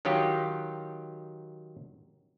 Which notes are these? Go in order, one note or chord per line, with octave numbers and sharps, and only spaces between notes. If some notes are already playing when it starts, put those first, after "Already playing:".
D#3 F#3 D#4 F4 G4